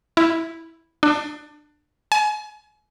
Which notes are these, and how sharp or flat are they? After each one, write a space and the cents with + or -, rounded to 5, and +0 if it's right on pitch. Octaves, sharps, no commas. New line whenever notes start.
E4 -5
D4 +20
G#5 +30